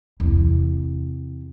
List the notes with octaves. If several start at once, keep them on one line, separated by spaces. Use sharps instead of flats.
E2 C3